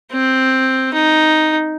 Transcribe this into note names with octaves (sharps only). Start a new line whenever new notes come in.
C4
D#4